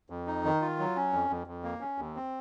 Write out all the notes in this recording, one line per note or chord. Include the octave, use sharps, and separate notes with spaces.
F2
D#4
D#3
F4
F#3
C#4
F2
F2
F2
A#3
C#4
D#2
C4